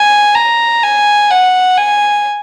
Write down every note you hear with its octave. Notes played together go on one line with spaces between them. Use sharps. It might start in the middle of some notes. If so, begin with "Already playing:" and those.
Already playing: G#5
A#5
G#5
F#5
G#5